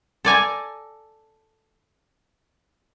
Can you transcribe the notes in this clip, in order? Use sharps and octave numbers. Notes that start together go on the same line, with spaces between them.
A4 D5 G#5 A#5